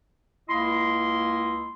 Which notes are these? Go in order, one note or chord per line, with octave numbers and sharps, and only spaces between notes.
C#2 A#3 E4 D#5 C6